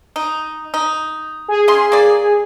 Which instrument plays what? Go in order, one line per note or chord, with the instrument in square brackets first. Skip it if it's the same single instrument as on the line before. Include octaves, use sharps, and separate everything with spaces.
[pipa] D#4
D#4
[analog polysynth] G#4
[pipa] C#4 D#5 C6
A#3 D5